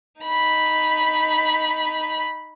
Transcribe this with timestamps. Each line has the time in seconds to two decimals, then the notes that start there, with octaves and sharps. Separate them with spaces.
0.22 D#4 B5